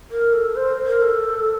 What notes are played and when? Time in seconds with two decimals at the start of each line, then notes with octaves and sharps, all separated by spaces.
0.11 A#4
0.33 A4
0.55 C5
0.86 A#4
1.01 A4